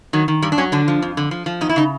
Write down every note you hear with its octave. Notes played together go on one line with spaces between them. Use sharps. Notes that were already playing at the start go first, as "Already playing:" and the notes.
D#3 F#3
D#3
G2 G3
D4
F#3 C#4
D3 D4
F3
F2
D3
F3
F3
E2 D#4
E4
C#3 D#4